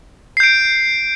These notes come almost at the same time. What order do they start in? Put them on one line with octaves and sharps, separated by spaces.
C7 G6 D7